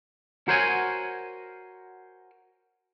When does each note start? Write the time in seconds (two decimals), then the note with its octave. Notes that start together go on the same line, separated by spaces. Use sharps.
0.48 F#4 A#4 C5 C#5 F#5 G#5